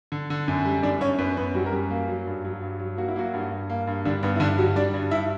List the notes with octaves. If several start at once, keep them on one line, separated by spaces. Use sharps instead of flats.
D3
D3
F#2
G3
F#2 D4 D5
F#2 C#4 C#5
F#2 B3 B4
F#2 B3 B4
F#3 G3 F#4
A#4
F#2 G3 G4
A#3
F#3
G2
F#3
G2
F#3
A#3 F#4
E4
F#3 A#3 F#4
G2
G2
A#3
G2
D3 G3 D4
G2 B3
E4
G2 D3 D4
F#3 G3 F#4
G3 D4 D5
G2
G2 E4 E5